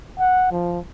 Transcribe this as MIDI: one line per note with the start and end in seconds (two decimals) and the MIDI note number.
0.19 0.50 78
0.51 0.79 53